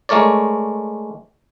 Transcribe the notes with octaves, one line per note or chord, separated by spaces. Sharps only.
G#3 A3 A#4 C#5 D5